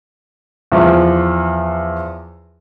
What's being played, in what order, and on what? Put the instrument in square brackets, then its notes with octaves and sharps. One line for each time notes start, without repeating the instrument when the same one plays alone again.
[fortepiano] E2 F3